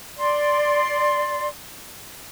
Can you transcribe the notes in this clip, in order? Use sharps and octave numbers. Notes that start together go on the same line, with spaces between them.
D5 C6